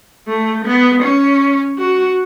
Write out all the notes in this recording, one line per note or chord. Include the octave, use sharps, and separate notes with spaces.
A3
B3
C#4
F#4